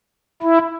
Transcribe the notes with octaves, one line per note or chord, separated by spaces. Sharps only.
E4